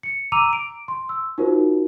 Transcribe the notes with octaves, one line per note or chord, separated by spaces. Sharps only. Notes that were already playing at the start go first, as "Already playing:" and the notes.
C#7
A#5 D6 E6 D#7 F7
D7
C6
E6
D#4 F4 F#4 A#4 C5